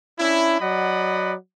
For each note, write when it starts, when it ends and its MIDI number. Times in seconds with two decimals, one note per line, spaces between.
0.19 0.58 61
0.19 0.58 62
0.19 0.58 64
0.61 1.34 54
0.61 1.34 74
0.61 1.34 75
0.61 1.34 78
0.61 1.34 83